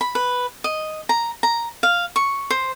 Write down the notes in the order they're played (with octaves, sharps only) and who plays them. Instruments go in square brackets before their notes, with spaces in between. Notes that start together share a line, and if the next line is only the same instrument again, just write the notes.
[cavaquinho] B5
B4
D#5
A#5
A#5
F5
C#6
C5